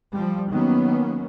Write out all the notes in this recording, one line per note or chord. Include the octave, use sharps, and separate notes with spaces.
F3 G3
D#3 F#3 A#3 B3 C#4